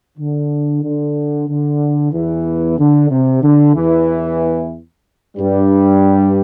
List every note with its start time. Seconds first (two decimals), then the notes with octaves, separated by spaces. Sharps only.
0.18 D3
0.82 D3
1.48 D3
2.12 E2 E3
2.78 D3
3.10 C3
3.42 D3
3.74 E2 E3
5.36 G2 G3